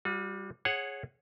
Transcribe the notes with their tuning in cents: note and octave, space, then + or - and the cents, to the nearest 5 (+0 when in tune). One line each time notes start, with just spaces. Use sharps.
G3 +0 F#4 -45
G#4 +0 C#5 -15 F#5 +0